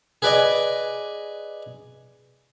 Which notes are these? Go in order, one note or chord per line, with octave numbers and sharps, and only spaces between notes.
G#4 B4 D5 D#5 G#5